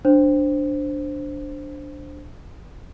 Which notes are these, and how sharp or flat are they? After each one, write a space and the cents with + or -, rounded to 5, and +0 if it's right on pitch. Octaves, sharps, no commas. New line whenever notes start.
D4 +0 C5 +0